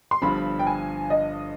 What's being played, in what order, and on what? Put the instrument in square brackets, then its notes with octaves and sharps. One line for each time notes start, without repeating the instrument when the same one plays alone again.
[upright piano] C6
[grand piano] G1 G2 F3 [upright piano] B5
[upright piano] G5
G#5
D#5